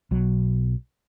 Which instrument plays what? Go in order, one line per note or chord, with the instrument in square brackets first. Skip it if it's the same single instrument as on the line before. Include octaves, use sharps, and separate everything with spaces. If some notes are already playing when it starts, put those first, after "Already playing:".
[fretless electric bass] B1 B2 F#3